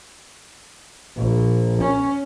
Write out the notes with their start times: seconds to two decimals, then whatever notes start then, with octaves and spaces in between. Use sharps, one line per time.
1.16 A#1
1.81 C#4